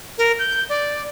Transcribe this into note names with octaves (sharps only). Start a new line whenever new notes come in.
A#4
G6
D5